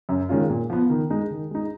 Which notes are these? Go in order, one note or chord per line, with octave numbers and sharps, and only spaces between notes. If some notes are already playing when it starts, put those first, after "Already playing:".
F#2
D#3 G#3 C#4 F4
A#2
F3 B3
D#3
G#3 D#4
D#3
G#3 D#4